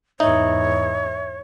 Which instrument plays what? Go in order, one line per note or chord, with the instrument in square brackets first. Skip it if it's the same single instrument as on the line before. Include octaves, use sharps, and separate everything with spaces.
[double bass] E2 G#2 [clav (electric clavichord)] D#4 [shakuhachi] C#5 [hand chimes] E5